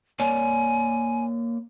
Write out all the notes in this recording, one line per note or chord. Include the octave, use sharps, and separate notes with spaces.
A#3 C#5 D5 G#5